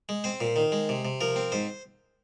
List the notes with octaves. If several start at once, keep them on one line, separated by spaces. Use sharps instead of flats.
G#3
C4 C5
A#2
D#3
G#3
C3
C3
F3 A#4
C4
G#2 C5